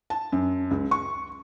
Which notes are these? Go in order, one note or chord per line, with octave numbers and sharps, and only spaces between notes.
A5
F#2
C#2
C#6